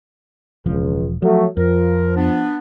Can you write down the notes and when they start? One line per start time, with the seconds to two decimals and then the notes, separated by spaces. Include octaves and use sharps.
0.66 E1 C#2 F3
1.22 F3 F#3 A3
1.57 F2 F3 A#4
2.16 B3 D4